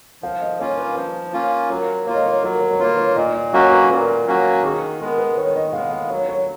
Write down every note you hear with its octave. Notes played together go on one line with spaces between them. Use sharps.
F3 F5
D#5
A#3 C#4 F4 C#5
B4
F3
A#3 C#4 F4
F#3 A#4
A#3 F4 C#5
D#5
C#5
F#3 A#4
C#5
C#5
A#3 F4 B4
C#5
A#2 D#5
D#5
F#3 A#3 C#4 F#4 D#5
B4
A#2 A#4
F#3 A#3 C#4 F#4
D#3 G#4
G#3 B3 A#4
B4
D#3 C#5
D#5
G#3 B3 F5
F5
F#3 C#5
C#5